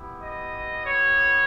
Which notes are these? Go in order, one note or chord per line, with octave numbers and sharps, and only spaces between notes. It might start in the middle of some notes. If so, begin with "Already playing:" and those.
Already playing: B3 E4 G4
D#5
C#5